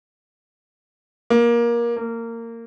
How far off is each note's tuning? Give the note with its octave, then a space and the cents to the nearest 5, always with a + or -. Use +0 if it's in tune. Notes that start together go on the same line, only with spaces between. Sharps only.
A#3 +20
A#3 -20